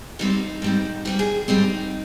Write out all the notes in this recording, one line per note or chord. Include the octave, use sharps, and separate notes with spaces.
G#2 G3 C4 D#4
G#2 G3 C4
G#2 G3 C4 G4
G#4
G#2 G3 C4 D#4